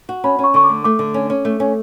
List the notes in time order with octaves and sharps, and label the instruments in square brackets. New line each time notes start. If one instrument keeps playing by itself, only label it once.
[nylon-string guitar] F#4
[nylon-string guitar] C#4 [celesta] B5
[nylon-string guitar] C#4
[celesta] C#6
[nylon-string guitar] D3 [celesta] C#6
[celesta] D6
[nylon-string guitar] A3
[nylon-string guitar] A3 [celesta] D6
[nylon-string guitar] D3
C#4
C#4
A3
C#4